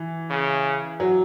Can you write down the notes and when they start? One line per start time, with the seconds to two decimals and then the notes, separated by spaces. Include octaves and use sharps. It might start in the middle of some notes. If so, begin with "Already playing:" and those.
Already playing: E3
0.30 C#3
1.00 F#3